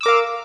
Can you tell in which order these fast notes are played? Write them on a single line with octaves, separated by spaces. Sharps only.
E6 D6 A#4 F5